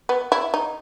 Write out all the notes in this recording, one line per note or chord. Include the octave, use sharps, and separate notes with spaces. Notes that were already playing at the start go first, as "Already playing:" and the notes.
B3
E4
D#4